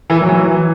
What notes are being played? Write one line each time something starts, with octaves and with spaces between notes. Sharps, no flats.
E3
F#3
E3
F#3
E3